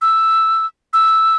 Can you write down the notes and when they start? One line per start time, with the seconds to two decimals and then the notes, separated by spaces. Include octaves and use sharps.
0.02 E6
0.93 E6